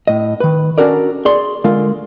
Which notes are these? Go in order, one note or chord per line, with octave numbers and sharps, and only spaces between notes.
A2 D#5
D#3 B4
C#4 D4 F#4 A4 A#4 D5
G#4 D5 C6
D3 G#3 F4 A#4 F5